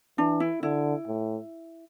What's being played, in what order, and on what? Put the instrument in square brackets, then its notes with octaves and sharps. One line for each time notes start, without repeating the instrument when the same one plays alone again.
[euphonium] E3 [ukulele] D4
[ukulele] E4
[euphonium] D3 [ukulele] E4
[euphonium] A2